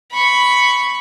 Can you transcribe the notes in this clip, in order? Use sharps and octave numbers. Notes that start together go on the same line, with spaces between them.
B5 C#6